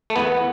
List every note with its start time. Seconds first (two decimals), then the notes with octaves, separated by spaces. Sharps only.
0.10 A3
0.16 E2 B3